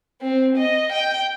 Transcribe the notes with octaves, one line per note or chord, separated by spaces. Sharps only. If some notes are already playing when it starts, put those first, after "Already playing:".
C4
D#5
G5